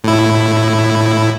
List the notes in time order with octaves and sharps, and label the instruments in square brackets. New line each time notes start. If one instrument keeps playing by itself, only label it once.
[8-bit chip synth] A2 E4